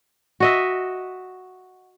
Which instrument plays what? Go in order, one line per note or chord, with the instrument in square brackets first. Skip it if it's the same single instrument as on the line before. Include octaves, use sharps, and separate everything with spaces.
[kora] F#4 D#5 E5